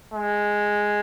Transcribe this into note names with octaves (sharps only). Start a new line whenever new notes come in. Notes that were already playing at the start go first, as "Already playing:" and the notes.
G#3